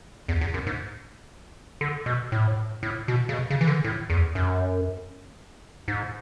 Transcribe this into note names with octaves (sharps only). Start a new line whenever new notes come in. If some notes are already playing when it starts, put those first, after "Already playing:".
E2
E2
F#2
G#2
D3
B2
A2
A2
B2
C#3
B2
C#3
E3
D3
A2
E2
F#2
G#2